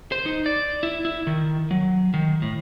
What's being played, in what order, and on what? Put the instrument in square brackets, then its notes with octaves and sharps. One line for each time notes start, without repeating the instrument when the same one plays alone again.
[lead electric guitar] C5
D#4
D5
E4
E4
D#3
F#3
D#3
A2